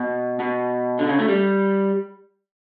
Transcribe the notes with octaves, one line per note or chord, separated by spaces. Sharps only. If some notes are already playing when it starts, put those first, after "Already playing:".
Already playing: B2
B2
D3
C#3
A3
G3